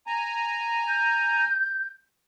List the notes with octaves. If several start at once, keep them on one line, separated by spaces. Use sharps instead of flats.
G#5 A#5
G6